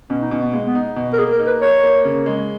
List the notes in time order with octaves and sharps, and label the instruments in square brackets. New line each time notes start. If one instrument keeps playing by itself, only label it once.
[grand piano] B2 [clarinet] C#4
[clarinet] D#4
[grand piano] B2 [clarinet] C#4
[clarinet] B3
[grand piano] G#3 [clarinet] A#3
[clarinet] B3
[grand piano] D#4
B2
[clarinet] A#4
[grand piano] A#3 [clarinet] G#4
[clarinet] A#4
[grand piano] D#4
[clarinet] B4
[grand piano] A#4 [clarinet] C#5
[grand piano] A#3
C#3
G#3